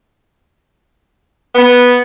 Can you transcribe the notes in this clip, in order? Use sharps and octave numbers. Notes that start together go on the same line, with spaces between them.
B3